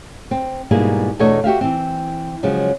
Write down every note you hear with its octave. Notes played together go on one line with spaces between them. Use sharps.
C4
G#2 B2 G3 A#3 E4 G#4
E2 B2 A3 D4 C#5 D#5
F#4 G4 E5 F5
E3 C4
C#3 F3 F#3 G#3